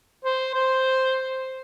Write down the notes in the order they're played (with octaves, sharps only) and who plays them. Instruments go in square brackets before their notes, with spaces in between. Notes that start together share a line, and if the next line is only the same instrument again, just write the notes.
[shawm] C5
C5